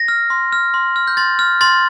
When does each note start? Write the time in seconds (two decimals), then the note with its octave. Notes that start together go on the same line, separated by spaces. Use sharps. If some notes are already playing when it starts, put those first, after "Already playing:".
Already playing: A#6
0.08 F6
0.30 C6
0.53 F6
0.74 C6
0.96 F6
1.08 G6
1.17 C6 A6
1.39 F6
1.61 C6 A6